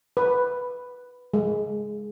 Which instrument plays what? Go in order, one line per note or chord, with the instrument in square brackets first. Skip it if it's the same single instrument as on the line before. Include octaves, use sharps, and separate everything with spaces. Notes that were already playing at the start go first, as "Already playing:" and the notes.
[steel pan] B4
G#3